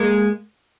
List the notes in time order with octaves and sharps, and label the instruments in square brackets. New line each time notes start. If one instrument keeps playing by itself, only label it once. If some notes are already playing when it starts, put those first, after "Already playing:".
Already playing: [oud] G#3 A#3